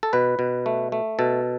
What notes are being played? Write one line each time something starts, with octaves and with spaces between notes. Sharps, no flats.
A4
B2 B4
B2
A3
A3
B2 A4